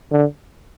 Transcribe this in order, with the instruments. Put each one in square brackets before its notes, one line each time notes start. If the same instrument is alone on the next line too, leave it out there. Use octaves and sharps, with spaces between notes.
[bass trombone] D3